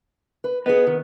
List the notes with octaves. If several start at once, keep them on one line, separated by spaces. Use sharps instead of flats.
B4
B3 G#4 B4 D#5
D#3